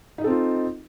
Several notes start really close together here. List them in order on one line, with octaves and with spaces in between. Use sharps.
D#4 D#5 A4 C4 F4